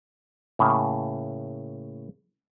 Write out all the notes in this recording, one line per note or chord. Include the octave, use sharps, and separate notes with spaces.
A2 C#3 A#3